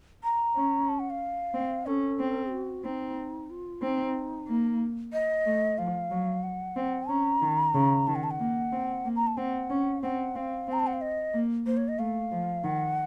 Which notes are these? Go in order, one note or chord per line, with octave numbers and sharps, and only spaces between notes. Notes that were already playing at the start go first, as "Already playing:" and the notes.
A#5
C#4
A5
F#5
F5
C4
C#4 A4
C4
F#4
C4 D#4
F4
C4 D#4
A#3
D#5
A3
F3 F5
F#3
F#5
C4
C#4 A#5
D#3
C#3
D#3 A5
F#5
A5
F#5
A#3
C4
A#3
A#5
A5
C4 F#5
C#4
C4 F#5
C4 F5
C4 A#5
A5
F#5
F5
D#5
A#3
A#3 C5
C#5
D#5
A3 F5
F3
D#3 F#5